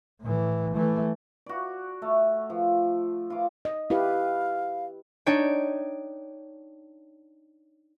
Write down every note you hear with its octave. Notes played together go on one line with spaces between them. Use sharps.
A2 E3
E3 A3
F#4 D5
A3
F3
F4 D6
D#5
E4 G4 B4 F5
D4 D#4 C#5 G5